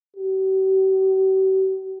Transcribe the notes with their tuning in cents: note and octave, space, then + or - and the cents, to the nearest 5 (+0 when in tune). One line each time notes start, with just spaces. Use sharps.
G4 -45